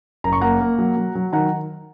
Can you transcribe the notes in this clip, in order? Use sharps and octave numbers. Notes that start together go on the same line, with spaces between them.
F#1 A#5
C#6
A#3 F#5 A#5
A#3
F#3
F#3
F#3
D#3 F#5 A#5